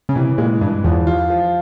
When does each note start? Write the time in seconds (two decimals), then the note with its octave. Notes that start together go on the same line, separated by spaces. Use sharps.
0.09 C#3
0.15 C3 E3
0.38 A#2 G#3
0.61 G2 E3
0.84 E2 F3
1.07 F4
1.30 F3